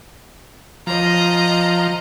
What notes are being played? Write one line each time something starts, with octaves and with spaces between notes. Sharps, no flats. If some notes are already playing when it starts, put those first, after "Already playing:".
F3 D#5 A#5